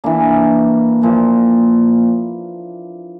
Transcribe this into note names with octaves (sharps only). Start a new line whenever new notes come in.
E3 A#3 D4
A#2 F3 A#3